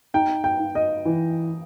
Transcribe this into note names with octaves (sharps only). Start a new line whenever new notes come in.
D#4 G5
G5
D#4
D#5
E3